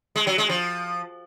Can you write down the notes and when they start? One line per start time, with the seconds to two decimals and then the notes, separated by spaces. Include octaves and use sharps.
0.16 G#3
0.27 F#3
0.38 G#3
0.49 F3